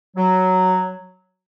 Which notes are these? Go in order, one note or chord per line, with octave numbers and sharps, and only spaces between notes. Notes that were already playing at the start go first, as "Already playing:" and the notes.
F#3